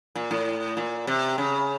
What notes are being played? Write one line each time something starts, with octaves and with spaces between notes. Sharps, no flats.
A#2
A2
A#2
C3
C#3